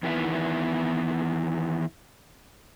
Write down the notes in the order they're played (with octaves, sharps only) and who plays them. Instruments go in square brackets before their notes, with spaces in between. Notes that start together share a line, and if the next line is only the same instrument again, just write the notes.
[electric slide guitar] E2 D#3 B3 E4 E5